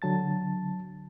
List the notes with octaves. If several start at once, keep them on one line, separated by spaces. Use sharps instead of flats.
D3 F#3 A5 A6